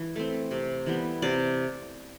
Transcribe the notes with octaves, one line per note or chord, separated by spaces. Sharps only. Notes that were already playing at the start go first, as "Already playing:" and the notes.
Already playing: E3
A3 C4
C3
E3 G3 B3
C3 D5